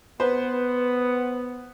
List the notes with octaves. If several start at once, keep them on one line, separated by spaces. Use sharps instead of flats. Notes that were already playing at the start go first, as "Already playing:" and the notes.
B3 B4 C5